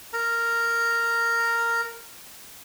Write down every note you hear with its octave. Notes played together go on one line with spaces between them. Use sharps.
A#4 A#5